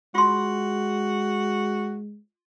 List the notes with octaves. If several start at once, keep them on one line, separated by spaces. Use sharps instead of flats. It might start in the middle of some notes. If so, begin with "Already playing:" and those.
G#3 F4 F#4 C6